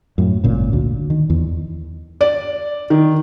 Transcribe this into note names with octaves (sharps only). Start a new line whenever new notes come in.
F#2 A2
G#1 A#2 C#3
D2
D#3
E2
D5
D#3